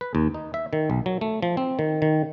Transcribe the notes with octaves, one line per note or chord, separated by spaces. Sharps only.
B4
D#2
D#4
E5
D#3
B1
F#3
A3
F3
C4
D#3
D#3